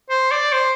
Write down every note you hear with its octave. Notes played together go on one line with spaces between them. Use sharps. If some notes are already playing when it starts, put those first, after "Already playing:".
C5
D5
C5